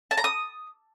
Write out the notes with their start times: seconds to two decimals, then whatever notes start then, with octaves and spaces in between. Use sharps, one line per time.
0.11 A5
0.17 A#5
0.24 D#6